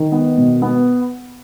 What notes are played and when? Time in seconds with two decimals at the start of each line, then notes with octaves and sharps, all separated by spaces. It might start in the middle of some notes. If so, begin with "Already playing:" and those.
Already playing: D#3
0.12 B3
0.37 B2
0.62 B3